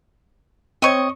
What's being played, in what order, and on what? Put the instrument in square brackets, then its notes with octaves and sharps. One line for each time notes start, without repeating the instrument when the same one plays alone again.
[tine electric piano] C4 C#5 [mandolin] D#5 C#6